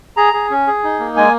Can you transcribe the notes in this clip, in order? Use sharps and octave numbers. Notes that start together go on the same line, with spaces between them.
G#4 A#5
G#4
C#4
G#4
D#4
A#3
G#3 G#5